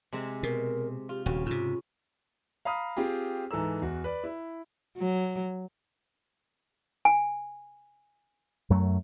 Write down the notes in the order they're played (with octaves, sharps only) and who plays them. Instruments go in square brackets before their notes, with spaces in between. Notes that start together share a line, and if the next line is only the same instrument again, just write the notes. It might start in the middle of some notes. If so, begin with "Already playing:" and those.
[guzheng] C3 G#3 C4
[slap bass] B2 [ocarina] A#4
[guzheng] F4 [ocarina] G4
[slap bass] D#1 [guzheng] C#3 [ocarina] F#4
[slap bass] G#2 C3 [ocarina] F4
[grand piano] F5 A#5 B5 D#6 F6
C4 F4 G4 G#4
G#2 E3 A4 A#5 E6
E2 F#4
B4 D5
E4
[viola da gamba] F#3
[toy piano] G#5
[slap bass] F#2 F#3 A3